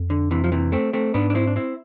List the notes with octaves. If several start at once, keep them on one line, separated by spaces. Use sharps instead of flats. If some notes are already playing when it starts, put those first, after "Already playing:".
Already playing: F2
D3
C3 E3
F3
C3 E3
A3 C4
A3 C4
G#2 B3 D4
D4
C4 E4
D4
C4 E4